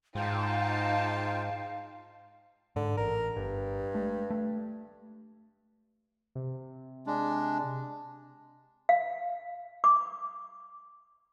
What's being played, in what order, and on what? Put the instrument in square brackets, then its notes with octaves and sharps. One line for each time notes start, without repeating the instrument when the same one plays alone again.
[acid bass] G#2 [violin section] D#4 A5 [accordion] F4 G5 [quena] F5
[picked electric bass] G#2 [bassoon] D3
[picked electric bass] A1 [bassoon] A#4
[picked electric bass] G1 [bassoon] G2
[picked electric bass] G#3 A3
A3
[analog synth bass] C3
[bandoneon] G#3 D4
[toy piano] F5
D6